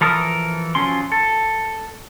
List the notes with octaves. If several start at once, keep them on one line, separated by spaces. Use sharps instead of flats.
E3 F3 A4 A#4 D#6
F3 F#3 C#4 C6
A4